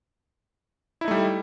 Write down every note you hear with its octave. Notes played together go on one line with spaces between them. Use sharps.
G3 A3 D#4 E4